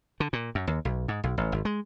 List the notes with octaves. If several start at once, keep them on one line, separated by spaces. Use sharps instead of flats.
D3
A#2
F#2
D#2
B1
G#2
B1
A1
G#1
G#3